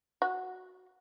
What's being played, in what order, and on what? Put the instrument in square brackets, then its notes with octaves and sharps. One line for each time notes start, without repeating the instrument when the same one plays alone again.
[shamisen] F#4